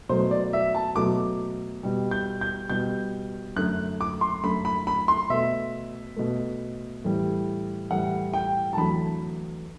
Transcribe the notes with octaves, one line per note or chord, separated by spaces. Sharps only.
B2 F#3 A3 C5
D5
E5
A5
B2 F#3 A3 D6
B2 G3
G6
G6
B2 G3 G6
F#2 D3 A3 F#6
D6
C6
F#2 D3 A3 B5
B5
B5
C6
B2 A3 E5
B2 A3
A2 E3 G3
A2 E3 G3 F#5
G5
A5
E2 D3 F#3 A3 B5